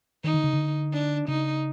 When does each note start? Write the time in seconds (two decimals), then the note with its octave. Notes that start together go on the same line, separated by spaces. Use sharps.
0.24 D#3 D#4
0.34 D3
0.44 C#3
0.53 D3
0.93 D4
1.28 C#3 D#4